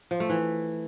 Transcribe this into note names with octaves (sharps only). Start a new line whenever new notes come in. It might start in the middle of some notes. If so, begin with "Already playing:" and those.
F3
A3
E3